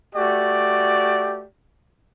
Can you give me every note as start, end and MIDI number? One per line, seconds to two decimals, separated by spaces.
0.15 1.45 57
0.15 1.45 66
0.15 1.45 67
0.15 1.45 74